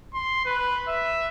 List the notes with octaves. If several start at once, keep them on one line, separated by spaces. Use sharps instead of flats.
C6
B4
E5